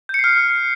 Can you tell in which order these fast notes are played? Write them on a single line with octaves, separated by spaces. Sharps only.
G6 C#7 C7 F6